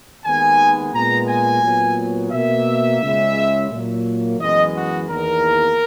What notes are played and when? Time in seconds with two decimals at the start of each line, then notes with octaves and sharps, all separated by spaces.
0.25 D#2 D#3 G#3 B3 G#5
0.94 A#2 G#3 B3 A#5
1.28 G#5
1.63 A#2 F#3 B3
2.32 B2 A#3 E5
3.01 C#2 C#3 G#3
3.71 A#2 F#3 A#3
4.39 F#2 E3 G#3 B3 D#5
4.75 F#4
5.09 E2 D#3 A#3 A#4